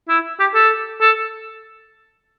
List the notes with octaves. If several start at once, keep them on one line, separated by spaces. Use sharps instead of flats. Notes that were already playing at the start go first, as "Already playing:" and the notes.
E4
G4
A4
A4